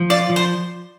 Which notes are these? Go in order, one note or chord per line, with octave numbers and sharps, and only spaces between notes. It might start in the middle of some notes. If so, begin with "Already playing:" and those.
Already playing: F3
F4 D5
F3
C5